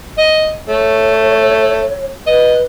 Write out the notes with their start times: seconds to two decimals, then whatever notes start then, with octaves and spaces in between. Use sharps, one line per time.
0.18 D#5
0.69 A3 C#5
2.26 B4 D#5